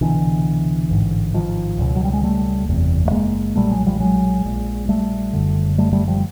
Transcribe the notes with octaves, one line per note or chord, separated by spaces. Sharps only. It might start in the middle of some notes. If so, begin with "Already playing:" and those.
C2 B2 D3 E3
A1 G#2
D#3 F3
C#2 B2
F#3
G3
G#3
G3 A3
F#1 E2 C3
A3
G#3 A#3
B1 A#2 G3 A3
F#3 G#3
F3 G3
F#3 G#3
A#1 A#2
G3 A3
F#1 F#2 D3
G3 A3
G3 A3
F3 G3